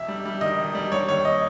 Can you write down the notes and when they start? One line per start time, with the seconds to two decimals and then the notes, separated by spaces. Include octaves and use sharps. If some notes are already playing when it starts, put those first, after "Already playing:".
Already playing: E1 E5
0.08 G3
0.25 G3
0.41 D#3 D#5
0.58 E1
0.75 G3
0.91 G3 C#5
1.08 D#2 C#5
1.25 D#5